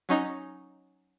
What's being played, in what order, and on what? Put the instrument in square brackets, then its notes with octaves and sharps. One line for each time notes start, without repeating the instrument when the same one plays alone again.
[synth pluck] F#3 C#4 D#4